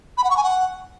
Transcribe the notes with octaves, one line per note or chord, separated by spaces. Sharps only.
B5
F#5
C#6
G#5
F#5